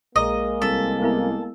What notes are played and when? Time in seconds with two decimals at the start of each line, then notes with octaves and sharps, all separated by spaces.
0.16 A#1 G#3 A#3 D#5 A#5
0.62 C2 A4 E6 B6
1.02 B3 E4 A#4